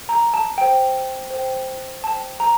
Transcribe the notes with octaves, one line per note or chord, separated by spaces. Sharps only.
A#5
A5
C5 G5
C5 G5
C5 G5 A5
A#5